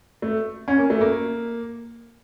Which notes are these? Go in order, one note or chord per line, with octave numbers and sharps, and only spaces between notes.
A3
C#4
A#3
A3
A#3